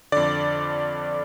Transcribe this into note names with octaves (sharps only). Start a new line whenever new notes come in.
F2 D3 D5